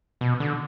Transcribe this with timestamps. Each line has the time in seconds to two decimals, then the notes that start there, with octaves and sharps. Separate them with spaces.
0.21 B2
0.40 D3